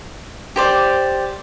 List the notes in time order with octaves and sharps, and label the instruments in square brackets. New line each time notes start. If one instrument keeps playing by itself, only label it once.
[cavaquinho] G4 C5 D5